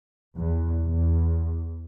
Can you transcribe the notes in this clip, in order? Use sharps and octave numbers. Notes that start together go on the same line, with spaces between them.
E2
E2